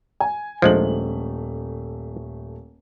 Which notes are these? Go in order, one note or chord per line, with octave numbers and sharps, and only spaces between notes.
G#5
D#1 F3 G#3 A3 D4 F#7